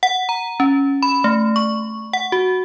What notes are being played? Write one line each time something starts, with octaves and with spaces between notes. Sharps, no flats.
F#5
A#5
C#4
B5
A3
C#6
F#5
F#4